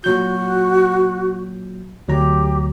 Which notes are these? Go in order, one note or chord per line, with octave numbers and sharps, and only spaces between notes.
A#2 F#3 F#4 G6
D2 F#3 G4 A#5